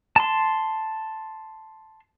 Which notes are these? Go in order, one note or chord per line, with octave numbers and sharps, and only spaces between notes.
A5 C6